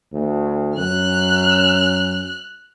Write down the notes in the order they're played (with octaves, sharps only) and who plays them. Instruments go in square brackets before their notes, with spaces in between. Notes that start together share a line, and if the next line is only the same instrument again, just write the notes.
[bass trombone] D2
[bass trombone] F#2 [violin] F6 F#6